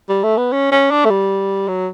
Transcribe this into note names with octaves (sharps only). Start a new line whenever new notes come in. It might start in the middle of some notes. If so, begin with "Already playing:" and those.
G3
A3
B3
C#4
C#4
D4
A3
G3
F#3